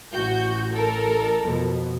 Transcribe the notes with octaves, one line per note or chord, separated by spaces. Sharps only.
A1 F#4 G6
A4 A#4
F2 B2